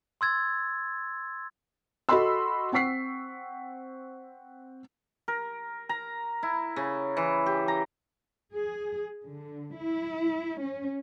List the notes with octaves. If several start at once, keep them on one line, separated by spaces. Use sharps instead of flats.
C6 E6 G#6 A6
F#4 A4 D#5 B5 C6 E6
C4 F#5 C#6 B6 C7
A#4
A#5
E4
C#3
E3
G4
A#5
G#4
D3
E4
C#4